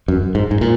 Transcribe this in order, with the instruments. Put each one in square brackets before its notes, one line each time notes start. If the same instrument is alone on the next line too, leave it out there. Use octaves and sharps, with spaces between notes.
[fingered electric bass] F#2
G#2
G#2
A#2